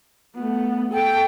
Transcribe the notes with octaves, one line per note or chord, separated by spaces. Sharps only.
A3 B3
A4 G5